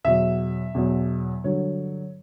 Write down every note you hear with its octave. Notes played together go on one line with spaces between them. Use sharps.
E2 B2 F#3 E5
E2 B2 F#3
G2 D3 F#3 C#5